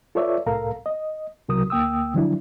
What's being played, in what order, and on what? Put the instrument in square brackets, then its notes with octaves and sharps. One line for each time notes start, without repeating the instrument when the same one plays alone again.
[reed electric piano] F4 A4 B4 C#5 D5 E5
C2 A2 A4 A#4 F5 A#5
D#5
C2 C3 F#3 A#4 D#6
D2 A#3 G5 D#6 E6
D3 F3 F#3 D4 E4